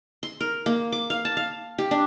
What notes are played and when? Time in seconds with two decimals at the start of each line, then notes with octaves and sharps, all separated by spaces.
0.23 C6
0.41 A#4
0.66 A#3
0.92 D6
1.10 F5
1.25 A5
1.37 F5
1.78 G4
1.91 D4